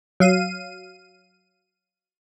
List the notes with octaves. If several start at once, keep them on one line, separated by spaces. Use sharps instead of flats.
F#3 F5 D#7